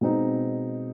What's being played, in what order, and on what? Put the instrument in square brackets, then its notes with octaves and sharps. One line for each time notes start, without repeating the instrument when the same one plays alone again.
[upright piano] B2 G#3 C4 D#4